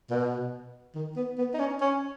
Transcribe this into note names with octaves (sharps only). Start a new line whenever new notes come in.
B2
D#3
B3
B3
D#4
C#4
C#4